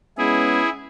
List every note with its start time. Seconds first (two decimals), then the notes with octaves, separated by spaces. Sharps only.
0.18 G#3 B3 C#4 E4 G#4